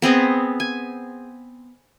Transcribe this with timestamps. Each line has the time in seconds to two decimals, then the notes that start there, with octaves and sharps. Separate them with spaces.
0.02 B3 C4 G#4 D#5
0.60 G#5